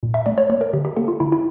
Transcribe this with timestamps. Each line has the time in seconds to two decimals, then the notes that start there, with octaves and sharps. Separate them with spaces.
0.03 A#2
0.14 E5
0.26 A3 D5
0.38 C#5
0.50 A#3 C#5
0.61 A#4
0.73 D3 G4
0.85 G4
0.97 A#3 A4
1.08 F4
1.20 D3 E4
1.32 E4